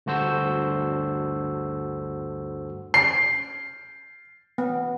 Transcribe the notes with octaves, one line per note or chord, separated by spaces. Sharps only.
D2 G2 F#4 A4 C5 E6
C7
B3